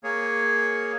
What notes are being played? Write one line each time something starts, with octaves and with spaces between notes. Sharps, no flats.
A#3 G#4 C#5